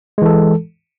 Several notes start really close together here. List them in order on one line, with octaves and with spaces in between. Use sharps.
G#3 E3 A4